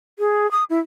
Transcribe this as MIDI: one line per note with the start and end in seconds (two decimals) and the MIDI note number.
0.19 0.50 68
0.51 0.64 87
0.70 0.79 64